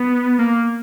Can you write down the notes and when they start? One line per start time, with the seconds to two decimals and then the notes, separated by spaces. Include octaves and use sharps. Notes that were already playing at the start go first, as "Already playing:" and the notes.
Already playing: B3
0.39 A#3